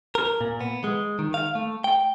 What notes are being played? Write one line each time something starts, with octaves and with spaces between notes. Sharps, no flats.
A#4
A#2
B3
G#3
D#3
F5
A3
G5